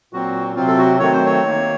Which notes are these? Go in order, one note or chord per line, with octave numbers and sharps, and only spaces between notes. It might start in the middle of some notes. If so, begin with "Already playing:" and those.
A#2 F#3 C4 F#4
C3 F#3 C4 F4
A4
F#4
D#3 F#3 A3 C4 C#5
C5
C#5
D#3 A#3